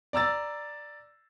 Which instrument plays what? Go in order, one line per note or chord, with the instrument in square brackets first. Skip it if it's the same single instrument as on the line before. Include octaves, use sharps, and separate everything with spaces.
[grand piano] D5 A#5 E6 A6